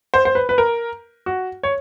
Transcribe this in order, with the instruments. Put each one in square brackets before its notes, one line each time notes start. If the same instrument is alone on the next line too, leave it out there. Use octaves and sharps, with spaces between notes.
[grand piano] C5
C5
B4
B4
A#4
F#4
C#5